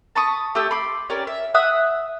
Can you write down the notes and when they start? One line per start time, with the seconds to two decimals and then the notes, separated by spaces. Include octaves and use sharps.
0.15 A5 B5 C#6 D#6
0.55 A3 G4 A4 E6
0.71 B5 C6 D6
1.10 C#4 G4 A#4 D5
1.27 E5
1.54 E5 F#5 D#6 E6